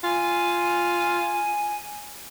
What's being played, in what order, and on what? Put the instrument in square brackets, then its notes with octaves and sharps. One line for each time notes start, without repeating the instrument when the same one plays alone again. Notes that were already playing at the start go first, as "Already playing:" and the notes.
[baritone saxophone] F4 [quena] G#5